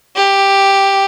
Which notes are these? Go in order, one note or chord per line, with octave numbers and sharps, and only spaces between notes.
G4